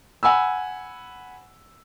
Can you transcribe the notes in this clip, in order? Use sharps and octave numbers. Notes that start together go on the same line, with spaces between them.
F#5 G#5 B5 E6